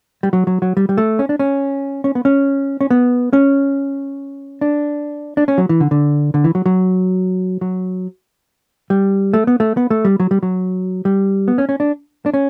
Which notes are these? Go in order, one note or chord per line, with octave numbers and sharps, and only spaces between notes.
G3
F#3
F#3
F#3
G3
G3
A3
C#4
D4
C#4
C#4
B3
C#4
C#4
B3
C#4
D4
D4
C#4
F#3
E3
D3
D3
D3
E3
F#3
F#3
F#3
G3
A3
B3
A3
B3
A3
G3
F#3
G3
F#3
G3
B3
C#4
C#4
D4
D4
C#4